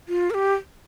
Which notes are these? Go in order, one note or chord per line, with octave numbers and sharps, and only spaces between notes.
F4
A#4
G4